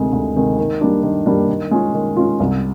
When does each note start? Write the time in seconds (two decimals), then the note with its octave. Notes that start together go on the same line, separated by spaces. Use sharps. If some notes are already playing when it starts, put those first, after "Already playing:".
Already playing: D2 C3 D#3 G#3
0.13 D2
0.35 C3 D#3 G#3
0.58 D#3
0.81 G3 A#3 D4
1.03 D#3
1.26 G3 A#3 D4
1.49 D#3
1.71 G#3 C#4 F4
1.94 D#3
2.16 G#3 C#4 F4
2.40 C2